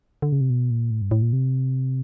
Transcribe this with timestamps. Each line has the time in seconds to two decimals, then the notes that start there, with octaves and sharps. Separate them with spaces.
0.22 D3
0.32 C#3
0.41 C3
0.50 B2
0.71 A#2
0.91 A2
1.02 G2
1.11 A2
1.22 A#2
1.33 C3